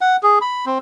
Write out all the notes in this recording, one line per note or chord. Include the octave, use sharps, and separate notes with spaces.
F#5
G#4
B5
C4